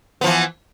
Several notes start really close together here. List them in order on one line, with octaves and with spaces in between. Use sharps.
B3 F3 E3